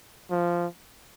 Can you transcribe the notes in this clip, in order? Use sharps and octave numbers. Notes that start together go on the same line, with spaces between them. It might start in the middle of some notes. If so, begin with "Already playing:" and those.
F3